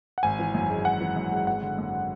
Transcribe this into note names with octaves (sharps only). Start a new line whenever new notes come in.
F#5
G#1 G#5
E3
F#2
G#3
G#1 F#5
E3
F#2
G#3
G#1 F#5
D3
F#2